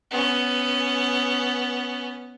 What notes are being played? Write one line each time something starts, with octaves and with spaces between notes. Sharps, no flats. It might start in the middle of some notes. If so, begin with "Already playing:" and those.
B3 C#4